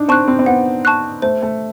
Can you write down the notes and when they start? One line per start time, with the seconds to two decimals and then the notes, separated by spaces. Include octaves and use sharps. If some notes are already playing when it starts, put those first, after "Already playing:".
Already playing: D4 D#4
0.08 C4 A5 C#6 F#6
0.28 C4
0.39 C4
0.46 B3 F#5
0.85 A5 C#6 F#6
1.22 A3 C5
1.42 A3